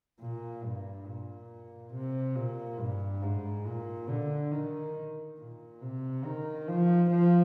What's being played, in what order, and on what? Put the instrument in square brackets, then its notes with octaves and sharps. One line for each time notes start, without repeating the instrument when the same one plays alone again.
[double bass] A#2
G2
A#2
C3
A#2
G2
G#2
A#2
D3
D#3
A#2
C3
D#3
F3
F3